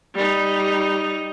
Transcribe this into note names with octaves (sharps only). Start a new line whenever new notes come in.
G3 D#4